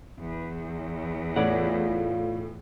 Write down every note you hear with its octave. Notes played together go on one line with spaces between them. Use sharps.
E2
A2 F4 C#5 D5 F#5